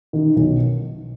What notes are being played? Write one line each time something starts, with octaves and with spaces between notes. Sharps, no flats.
D#3
B1